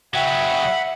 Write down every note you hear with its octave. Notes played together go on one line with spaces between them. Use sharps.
C#3 F#3 E5 F#5 G5 B5